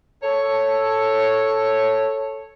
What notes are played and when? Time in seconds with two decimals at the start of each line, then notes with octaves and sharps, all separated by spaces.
0.22 A4 C#5